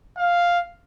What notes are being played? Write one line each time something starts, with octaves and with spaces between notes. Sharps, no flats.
F5